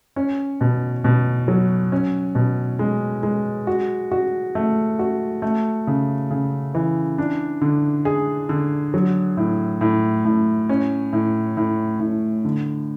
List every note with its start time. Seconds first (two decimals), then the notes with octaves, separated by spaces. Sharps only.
0.16 C#4
0.61 B2
1.04 B2
1.48 F#3
1.92 C#4
2.35 B2
2.79 G#3
3.23 G#3
3.67 F#4
4.12 F#4
4.55 A3
4.99 F#4
5.42 A3
5.87 C#3
6.30 C#3
6.74 E3
7.18 D4
7.61 D3
8.05 G#4
8.49 D3
8.94 F#3
9.37 A2
9.81 A2
10.25 A2
10.69 C#4
11.13 A2
11.57 A2
12.00 A2
12.45 D3